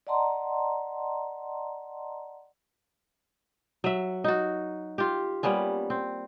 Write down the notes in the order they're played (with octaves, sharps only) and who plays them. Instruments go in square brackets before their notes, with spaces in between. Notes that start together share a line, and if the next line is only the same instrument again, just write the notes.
[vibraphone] D5 D#5 F#5 A5 A#5 C6
[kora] F#3 E5
D#4 F#4
F4 G4
G3 A#3 B3 C#4
C4